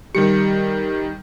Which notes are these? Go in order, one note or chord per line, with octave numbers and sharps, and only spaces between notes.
D#3 G3 G4 C#7